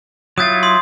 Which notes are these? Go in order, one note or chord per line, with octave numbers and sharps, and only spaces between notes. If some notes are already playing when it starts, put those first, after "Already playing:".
F#3 E4 F4 D#6 G6 A6
C6 D#6